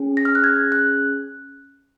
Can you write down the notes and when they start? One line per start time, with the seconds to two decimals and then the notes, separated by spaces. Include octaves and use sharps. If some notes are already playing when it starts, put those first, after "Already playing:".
Already playing: C#4 G#4
0.17 A#6
0.25 F6
0.35 F#6
0.44 G#6
0.72 F#6